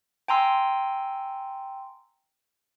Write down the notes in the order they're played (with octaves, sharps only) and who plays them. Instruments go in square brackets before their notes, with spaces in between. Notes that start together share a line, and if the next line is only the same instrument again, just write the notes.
[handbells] G5 G#5 A#5 C6 E6